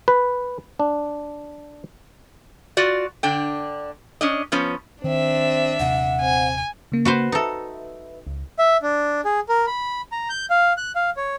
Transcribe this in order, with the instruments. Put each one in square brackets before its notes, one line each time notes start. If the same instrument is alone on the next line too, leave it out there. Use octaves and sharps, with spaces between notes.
[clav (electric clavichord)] B4
D4
[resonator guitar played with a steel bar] F4 F#4 D5
D3 D4 G5
C#4 D4 D#5
F3 B3 C#4
[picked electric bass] D#3 [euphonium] C4 [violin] D4 E5
[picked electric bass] D#1 C3 [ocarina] F#5
[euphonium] C4 [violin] G#5
[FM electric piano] C#3 A#3
[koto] F#4 B4 C5
[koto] D#4 A4 [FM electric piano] B4 E5
[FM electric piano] C#2
[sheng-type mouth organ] E5
D4
G#4
A#4
B5
A#5
G6
F5
F#6
F5
C#5